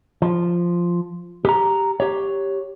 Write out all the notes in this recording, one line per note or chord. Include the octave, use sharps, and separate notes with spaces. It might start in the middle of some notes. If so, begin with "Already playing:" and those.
F3
G4 A#5
G4 C#5